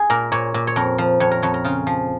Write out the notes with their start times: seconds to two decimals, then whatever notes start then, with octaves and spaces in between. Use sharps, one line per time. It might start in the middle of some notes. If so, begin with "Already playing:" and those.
Already playing: G#4
0.10 A#2 A#4
0.32 A#2 C#5
0.54 A#2
0.67 C#5
0.76 F2 A#4
0.98 F3
1.20 F2 C#5
1.31 A#4
1.42 F2 C#5
1.54 A#4
1.64 C#3 F4
1.87 F3